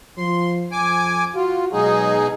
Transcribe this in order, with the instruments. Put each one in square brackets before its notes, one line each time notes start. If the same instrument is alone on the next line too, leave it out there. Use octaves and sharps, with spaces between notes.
[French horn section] F3 [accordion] C6
[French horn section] F2 F3 [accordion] G#5 D6
[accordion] F4 [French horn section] F#4
[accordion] B2 D#4 G#4 [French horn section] F#3 G#3